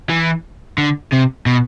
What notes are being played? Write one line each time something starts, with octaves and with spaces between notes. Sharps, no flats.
E3
D3
C3
B2